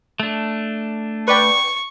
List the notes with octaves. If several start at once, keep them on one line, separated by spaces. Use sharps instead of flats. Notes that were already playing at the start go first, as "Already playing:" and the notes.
A3 D4
B4 D5 G5 C#6